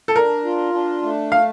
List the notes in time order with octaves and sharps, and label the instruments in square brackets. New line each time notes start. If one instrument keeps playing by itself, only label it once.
[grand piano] A4
[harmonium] D4 [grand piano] A#4
[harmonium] F4
D4
A3
[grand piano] F5